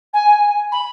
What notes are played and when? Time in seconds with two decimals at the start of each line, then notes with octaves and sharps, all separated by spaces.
0.13 G#5
0.72 B5